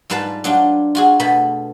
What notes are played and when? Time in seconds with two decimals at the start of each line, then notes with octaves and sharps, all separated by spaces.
0.10 G#2 G3 F4 B4 F5 A5
0.44 F#3 D4 F4 G4
0.95 F4 F#4 G#4
1.20 B2 A3 B3 B5